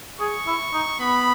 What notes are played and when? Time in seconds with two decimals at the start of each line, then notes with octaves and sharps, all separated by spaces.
0.19 G#4 C#6
0.47 E4
0.73 D#4
1.00 B3 B5